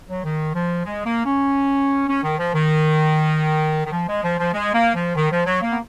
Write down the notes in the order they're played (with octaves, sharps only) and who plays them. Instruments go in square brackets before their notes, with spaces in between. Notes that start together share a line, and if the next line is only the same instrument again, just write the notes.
[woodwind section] F#3
D#3
F3
G#3
A#3
C#4
C#4
D#3
F3
D#3
D#3
F3
G#3
F3
F3
G#3
A#3
F3
D#3
F3
F#3
A#3
B3